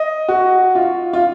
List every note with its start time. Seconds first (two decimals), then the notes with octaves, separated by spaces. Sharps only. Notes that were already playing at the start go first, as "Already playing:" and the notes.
Already playing: D#5
0.29 F#4
0.75 F4
1.13 F4